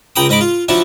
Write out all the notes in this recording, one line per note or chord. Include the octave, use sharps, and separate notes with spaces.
C#2 G5 A#5 B5 D#6
G#2 D#5 B5 D6
F4
F3 F#3 D4 E4